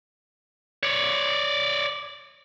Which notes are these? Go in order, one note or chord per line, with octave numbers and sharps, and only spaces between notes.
C#5 D5